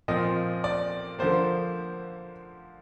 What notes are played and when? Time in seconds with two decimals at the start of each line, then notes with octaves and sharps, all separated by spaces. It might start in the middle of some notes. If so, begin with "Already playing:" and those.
0.08 A#2 F3 C4 D#5
0.64 D5
1.19 D3 F3 A#3 C5